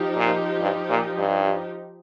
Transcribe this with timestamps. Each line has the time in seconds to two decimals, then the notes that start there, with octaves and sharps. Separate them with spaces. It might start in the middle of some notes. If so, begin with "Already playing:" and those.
Already playing: F3 D#4 G4
0.17 A#2
0.60 G2
0.89 A#2
1.18 G2